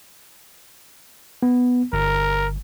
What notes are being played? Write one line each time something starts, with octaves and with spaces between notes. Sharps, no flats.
B3
G1 A#4